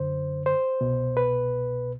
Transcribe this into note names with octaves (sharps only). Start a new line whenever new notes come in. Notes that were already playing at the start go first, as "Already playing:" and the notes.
Already playing: F#2 D3 C5
C5
C2 B2
B4